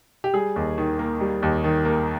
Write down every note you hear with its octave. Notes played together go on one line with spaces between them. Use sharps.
G4
G3 G#4
D#2
D#3
A#3
G3
D#2
D#3
A#3